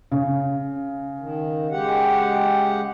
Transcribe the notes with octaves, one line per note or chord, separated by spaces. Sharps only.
C#3
D#3
G#3 G4 F#5